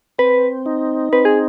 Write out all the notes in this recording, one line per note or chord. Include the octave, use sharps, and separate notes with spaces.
C4 B4
D#4
C4 B4
G#4